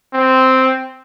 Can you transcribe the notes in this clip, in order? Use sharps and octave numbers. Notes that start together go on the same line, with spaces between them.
C4